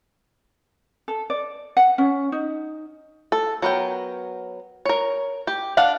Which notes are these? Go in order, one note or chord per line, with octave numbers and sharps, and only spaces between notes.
A4
D5
F#5
C#4
D#4
A4
F#3 B3 A#4 G5
A#4 C#5
G4
D4 F5 F#5